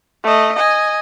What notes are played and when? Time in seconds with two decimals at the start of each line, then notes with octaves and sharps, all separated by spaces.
0.24 A3 D#5
0.56 D#5 G#5